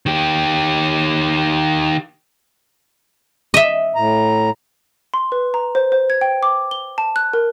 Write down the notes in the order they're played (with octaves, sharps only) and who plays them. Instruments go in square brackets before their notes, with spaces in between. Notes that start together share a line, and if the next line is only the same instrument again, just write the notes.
[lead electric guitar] D#3 G4
[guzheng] D#5 E5
[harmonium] A2 A#5
[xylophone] C6
B4
A#5
C5
C5
G#6
G5
D6
G7
A5
F#6
A#4